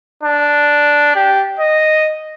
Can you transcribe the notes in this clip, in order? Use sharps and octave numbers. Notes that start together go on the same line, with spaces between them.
D4
G4
D#5